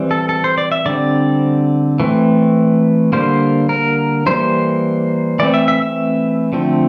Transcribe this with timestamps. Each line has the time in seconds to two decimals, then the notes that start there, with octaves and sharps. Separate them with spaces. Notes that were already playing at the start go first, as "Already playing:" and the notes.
Already playing: E3 G3 C4
0.11 A4
0.29 A4
0.44 C5
0.58 D5
0.72 E5
0.86 D3 G3 C4 D5
2.00 E3 A3 C4
3.13 D3 G3 A#3 C5
3.69 A#4
4.26 E3 G3 A#3 C5
5.39 E3 A3 C4 D5
5.54 E5
5.68 E5
5.82 E5
6.53 D3 F3 A3 C4